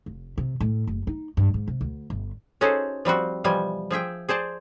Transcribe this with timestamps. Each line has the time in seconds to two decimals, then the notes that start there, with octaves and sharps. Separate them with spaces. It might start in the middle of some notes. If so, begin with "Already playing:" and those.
0.06 F1
0.38 C3
0.60 A2
0.87 F#1
1.07 D#4
1.37 G2
1.54 G#2
1.68 C3
1.81 D2
2.10 G1
2.61 C#4 D#4 F#4 G#4 A4 C5
3.05 F3 G3 C4 F#4
3.44 B2 E3 F3 G3 G#5
3.91 F3 G#4 E5 G5
4.29 G#4 C5 D5 A5